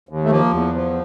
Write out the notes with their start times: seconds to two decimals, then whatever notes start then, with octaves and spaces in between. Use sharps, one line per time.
0.09 D#2
0.24 A3
0.30 F3 A#3
0.53 E2
0.75 F3